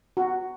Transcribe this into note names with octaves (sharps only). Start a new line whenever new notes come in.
F#4